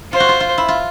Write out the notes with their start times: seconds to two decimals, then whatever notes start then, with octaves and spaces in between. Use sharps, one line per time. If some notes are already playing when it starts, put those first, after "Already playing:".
0.12 F4 C5
0.20 F#4
0.29 F4
0.40 F4
0.58 E4
0.68 F4